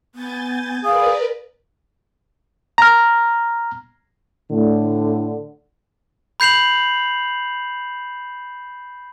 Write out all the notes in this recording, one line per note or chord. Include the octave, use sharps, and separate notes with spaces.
B3 G#5 G6 A6
G#4 A#4 B4 D5 F5
A#5 F6
A2 D3
B5 G6 C7 F7 F#7